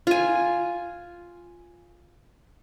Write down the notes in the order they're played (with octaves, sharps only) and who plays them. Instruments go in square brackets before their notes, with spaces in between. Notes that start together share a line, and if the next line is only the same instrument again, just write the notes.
[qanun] F4 G#5